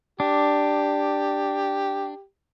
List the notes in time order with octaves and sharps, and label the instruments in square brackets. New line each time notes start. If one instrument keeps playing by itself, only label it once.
[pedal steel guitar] D4 [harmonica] G4